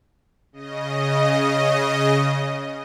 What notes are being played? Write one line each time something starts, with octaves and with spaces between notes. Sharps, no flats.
C#3 D#5